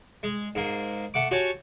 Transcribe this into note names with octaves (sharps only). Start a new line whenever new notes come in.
G#3
G#2 A#3
A3 F#5 D6
F#4 G4 C#5 G#5 A5